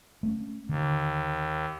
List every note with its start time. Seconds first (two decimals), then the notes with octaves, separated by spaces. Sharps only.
0.23 A3 C4 C#4
0.69 D#2 D3